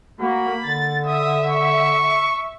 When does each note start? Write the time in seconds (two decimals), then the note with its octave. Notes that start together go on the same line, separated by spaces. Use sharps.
0.21 A#3 F#4 B5
0.65 D3 A6
1.06 E5 D#6
1.47 C#6